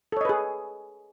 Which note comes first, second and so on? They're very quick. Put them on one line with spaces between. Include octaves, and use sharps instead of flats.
A4 C#5 D#5 B4 G#4